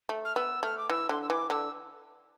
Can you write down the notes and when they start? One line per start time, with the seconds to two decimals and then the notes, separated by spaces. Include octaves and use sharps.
0.09 A3
0.25 F6
0.35 B3 E6
0.63 A3 F6
0.78 D6
0.89 E3 E6
1.09 D3 C6
1.22 E6
1.29 E3 D6
1.50 D3 E6